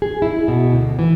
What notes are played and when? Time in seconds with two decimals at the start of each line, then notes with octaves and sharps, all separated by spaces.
0.02 G#4
0.22 E4
0.48 B2
0.72 D2
0.99 E3